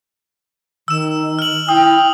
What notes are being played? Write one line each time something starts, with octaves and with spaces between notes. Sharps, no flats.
D#3 E6 E7
F6 F#7
E4 G5 D#6